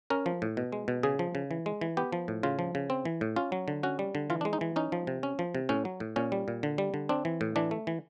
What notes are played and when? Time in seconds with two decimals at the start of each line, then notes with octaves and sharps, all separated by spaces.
0.10 C#4 A#4
0.26 F3
0.42 A2
0.57 B2
0.72 G#3
0.88 B2
1.03 C#3 G#4
1.19 F3
1.35 C#3
1.51 E3
1.66 G#3
1.81 E3
1.97 B3 G4
2.13 F3
2.28 A2
2.43 C#3 F4
2.59 F3
2.75 C#3
2.90 C4
3.05 E3
3.21 A2
3.36 C#4 F4
3.52 F#3
3.68 D3
3.83 C#4 F#4
3.99 G3
4.15 D3
4.30 E3 F4
4.41 D4
4.45 G#3
4.53 D#4
4.61 E3
4.76 C#4 D#4
4.92 F3
5.07 C3
5.23 C#4
5.39 F3
5.55 C3
5.69 A2 C#4
5.85 F#3
6.00 A2
6.16 A#2 C#4
6.32 G3
6.48 A#2
6.63 D3
6.78 G3
6.94 D3
7.09 C4 D4
7.25 E3
7.41 A2
7.56 E3 D4
7.71 A3
7.87 E3